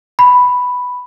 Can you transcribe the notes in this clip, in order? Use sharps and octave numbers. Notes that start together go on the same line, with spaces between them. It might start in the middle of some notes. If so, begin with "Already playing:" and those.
B5